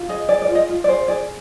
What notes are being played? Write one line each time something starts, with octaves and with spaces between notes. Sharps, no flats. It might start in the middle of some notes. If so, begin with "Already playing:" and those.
Already playing: F4
G#4 D#5
G#4 D5
D5
F4
D#5
F4
D5
G#4 C5
G#4 D5